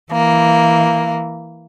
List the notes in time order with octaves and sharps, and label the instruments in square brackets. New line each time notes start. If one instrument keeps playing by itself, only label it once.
[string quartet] E3 A#3